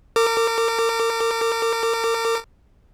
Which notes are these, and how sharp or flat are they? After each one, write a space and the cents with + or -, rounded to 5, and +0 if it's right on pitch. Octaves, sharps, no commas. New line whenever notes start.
A#4 -35 D6 +0